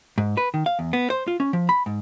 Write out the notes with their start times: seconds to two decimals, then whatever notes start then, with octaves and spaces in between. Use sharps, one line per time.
0.18 G#2
0.37 B4
0.54 D#3
0.66 F5
0.79 E2
0.93 B3
1.10 C5
1.28 F4
1.40 C#4
1.53 F3
1.69 B5
1.86 G#2